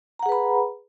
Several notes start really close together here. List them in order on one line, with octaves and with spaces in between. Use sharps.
A#5 F#5 G#4 B4 B5